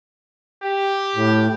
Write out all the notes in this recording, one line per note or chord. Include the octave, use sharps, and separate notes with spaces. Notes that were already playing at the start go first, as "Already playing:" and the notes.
G4
A2